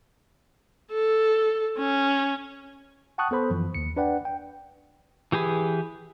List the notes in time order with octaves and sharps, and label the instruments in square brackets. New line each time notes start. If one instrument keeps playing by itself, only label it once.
[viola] A4
C#4
[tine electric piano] F#5 G5 A5 C#6 D#6 F#6
B3 A4 C5 B5
F#2 E3 F3
D#2 C#7
D4 B4 D5 F#5 G5
G5
[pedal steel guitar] E3 G4 G#4 B4